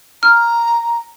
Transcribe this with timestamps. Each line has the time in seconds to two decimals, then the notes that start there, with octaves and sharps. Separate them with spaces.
0.23 A#5 F6